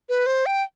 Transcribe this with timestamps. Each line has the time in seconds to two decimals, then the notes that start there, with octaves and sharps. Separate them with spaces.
0.09 B4
0.26 C5
0.46 G5